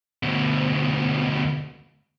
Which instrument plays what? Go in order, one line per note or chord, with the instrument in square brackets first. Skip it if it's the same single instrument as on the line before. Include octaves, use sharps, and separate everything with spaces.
[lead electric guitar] D2 B2